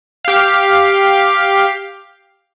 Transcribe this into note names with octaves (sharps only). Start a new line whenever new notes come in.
G4 F5